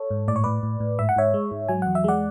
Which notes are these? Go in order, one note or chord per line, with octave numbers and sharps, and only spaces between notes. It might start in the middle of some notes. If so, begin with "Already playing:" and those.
Already playing: A4 C#5
G#2
A2 D5
C#5
A2 B4 D5
A2
A2
G#2 E5
F#5
G#2 C#5 E5
G#3
G#2
F#3 G#5
E2 F#5
E5
G#3 D5 F#5